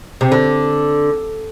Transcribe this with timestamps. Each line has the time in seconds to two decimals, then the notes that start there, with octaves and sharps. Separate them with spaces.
0.21 C3
0.32 D3